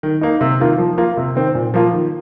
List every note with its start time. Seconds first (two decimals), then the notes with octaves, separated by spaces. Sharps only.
0.03 D#3
0.21 A#3 D#4
0.41 C3
0.60 D#3 A#3 F4
0.78 F3
0.98 A#3 F4
1.17 C3
1.35 D#3 C4
1.55 A#2
1.74 F3 A#3 F4
1.93 D#3